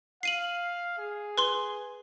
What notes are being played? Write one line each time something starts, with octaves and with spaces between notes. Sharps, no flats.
F5 C7 D#7 F#7
G#4
B4 C6 G7